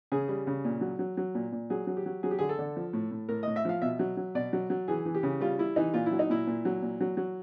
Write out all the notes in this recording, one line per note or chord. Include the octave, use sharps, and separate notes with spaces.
C#3 G#4
G3
C#3
A#2
F#3
F#3
F#3
A#2
A#2
F#3 G#4
F#3
G4
F#3
F#3 G#4
G4
D3 G#4
A4
D3
F3
A2
A2
A2 A#4
A2 D#5
E5
F3 F5
B2 E5
F#3
F#3
B2 D5
F#3
F#3
E3 G#4
E3
G4
C#3
G3 F4
G3 E4
E3 D#4
A#2 F4
E4
F#3
D#4
A#2 E4
A#2
F#3
A#2
F#3
F#3